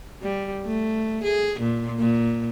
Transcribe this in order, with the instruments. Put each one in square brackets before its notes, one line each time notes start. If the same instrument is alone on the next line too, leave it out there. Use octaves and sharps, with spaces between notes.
[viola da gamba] G3
A3
G#4
A#2
A#2